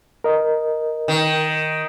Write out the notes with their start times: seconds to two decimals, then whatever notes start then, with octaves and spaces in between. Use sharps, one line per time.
0.24 A#4 D#5
1.08 D#3